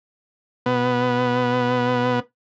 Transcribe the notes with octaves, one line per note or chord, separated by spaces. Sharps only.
B2 B3